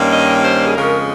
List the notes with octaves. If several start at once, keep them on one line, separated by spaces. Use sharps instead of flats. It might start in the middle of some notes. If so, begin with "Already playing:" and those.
Already playing: G2 D#3 G3 A#3 C#4
D#5
C5
G#4
F2 C#3 G#3 C#4 A#4